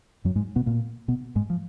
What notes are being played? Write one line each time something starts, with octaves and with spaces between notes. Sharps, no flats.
F#2 F#3
G#2 G#3
B2 B3
A#2 A#3
B2 B3
G#2 G#3
F3